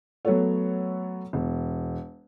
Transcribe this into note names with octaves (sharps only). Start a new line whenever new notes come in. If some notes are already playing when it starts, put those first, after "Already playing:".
F#3 A3 B3 F#4 A4 C#5
E1